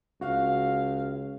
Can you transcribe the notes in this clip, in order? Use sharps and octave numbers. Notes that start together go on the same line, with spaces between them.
C#2 F#4 F5